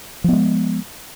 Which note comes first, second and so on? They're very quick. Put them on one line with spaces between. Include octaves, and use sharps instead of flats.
F3 B3 G#3